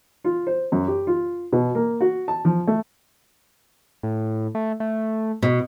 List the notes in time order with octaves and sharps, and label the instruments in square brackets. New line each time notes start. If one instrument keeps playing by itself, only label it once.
[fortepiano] F4
C5
F#2
G4
F4
B2
A#3
F#4
A5
F3
A3
[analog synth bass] A2
A3
A3
[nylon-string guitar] B2